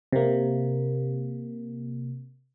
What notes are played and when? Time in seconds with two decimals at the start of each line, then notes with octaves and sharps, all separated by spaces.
0.12 C3 A#3